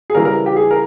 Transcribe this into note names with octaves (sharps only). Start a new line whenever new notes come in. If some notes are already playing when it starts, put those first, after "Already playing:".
G#4
C#3 E3 G3 A#4
A#4
G4
G#4
A#4